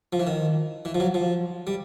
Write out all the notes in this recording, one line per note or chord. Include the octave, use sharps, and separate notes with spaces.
F3
E3
D#3
E3
F3
F#3
F3
G3